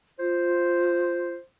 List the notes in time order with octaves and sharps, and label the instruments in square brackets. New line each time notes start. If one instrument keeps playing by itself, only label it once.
[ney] F4 [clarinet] C5